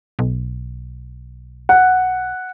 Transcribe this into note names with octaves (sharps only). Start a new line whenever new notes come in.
B1
F#5